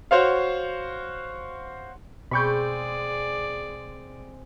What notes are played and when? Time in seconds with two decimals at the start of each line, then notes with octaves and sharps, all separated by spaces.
0.11 F#4 C5 C#5 F5
2.31 B2 G#3 C4 G#4 D5 B5 C#6 G6